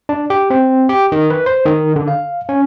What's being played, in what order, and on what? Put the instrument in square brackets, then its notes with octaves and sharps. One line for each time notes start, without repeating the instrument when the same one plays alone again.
[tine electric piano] D4
G4
C4
G4
D#3
B4
C5
D#3
D3
F5
C#4